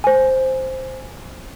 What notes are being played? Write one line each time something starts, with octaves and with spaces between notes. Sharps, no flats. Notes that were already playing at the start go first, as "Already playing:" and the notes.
C5 G#5